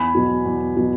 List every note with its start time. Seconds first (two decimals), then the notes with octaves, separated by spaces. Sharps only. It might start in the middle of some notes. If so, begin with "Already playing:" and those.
Already playing: E2 G#5 B5
0.15 B2 F#3
0.46 E2
0.77 B2 F#3